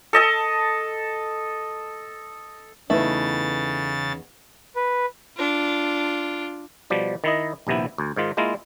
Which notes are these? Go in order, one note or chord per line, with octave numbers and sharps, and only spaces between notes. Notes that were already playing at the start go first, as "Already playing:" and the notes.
A4 D#5 A5
E2 C#3 A3 D#4 E4 B4 A6
B4
D4 F4
B2 F3 G3 G4
D#3 E4 D#5
A#1 D#2 C3 B3 E4
D2
G#2 D#3 F4
G#3 A#3 E4 F4 A#4